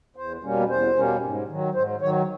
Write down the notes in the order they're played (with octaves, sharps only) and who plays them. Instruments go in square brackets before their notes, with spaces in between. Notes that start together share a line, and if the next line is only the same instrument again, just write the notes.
[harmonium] E2 C5
B2 G3 A#3 C#4
E2 C5
B2 G3 A#3 C#4
G#2
D#3 F#3
G#2 C5
D#3 F#3 C#5